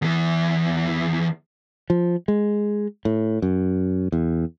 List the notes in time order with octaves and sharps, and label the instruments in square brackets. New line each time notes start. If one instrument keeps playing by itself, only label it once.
[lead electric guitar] E2 E3
[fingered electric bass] F3
G#3
A2
F#2
E2